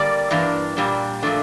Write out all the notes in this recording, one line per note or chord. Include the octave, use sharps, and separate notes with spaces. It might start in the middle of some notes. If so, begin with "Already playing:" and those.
Already playing: D3 G3 A#3 D5
G2 E3 A#3 D4
A#2 G3 D4
A#2 F3 A3 D4